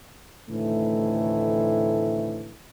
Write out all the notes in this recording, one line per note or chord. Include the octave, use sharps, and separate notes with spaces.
D2 A2 C3 D#3 E3 A3